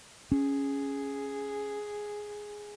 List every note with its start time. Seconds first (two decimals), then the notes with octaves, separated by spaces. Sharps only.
0.32 C#4 G#4